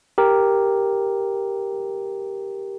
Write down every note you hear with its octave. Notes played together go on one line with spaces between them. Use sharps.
G4 A#4